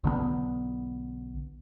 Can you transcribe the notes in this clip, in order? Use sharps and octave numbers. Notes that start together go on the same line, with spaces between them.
B1 D3 F#3 B3